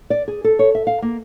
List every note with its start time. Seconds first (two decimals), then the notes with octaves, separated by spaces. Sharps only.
0.10 D5
0.28 G#4
0.44 A4
0.59 C#5
0.75 E5
0.87 F5
1.02 A#3